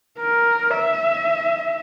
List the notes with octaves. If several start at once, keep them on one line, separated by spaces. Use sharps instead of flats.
A#4
E5